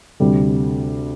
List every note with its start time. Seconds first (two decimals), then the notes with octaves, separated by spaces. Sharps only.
0.20 D2 C3 G3